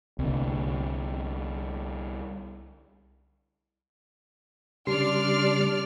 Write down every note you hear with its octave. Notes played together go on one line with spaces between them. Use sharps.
C2 D3
C#3 G3 D4 D5 C6 F6